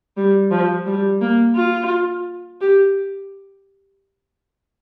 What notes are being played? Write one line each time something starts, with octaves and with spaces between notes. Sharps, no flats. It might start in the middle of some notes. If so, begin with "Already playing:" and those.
G3
F3
G3
A#3
F4
G4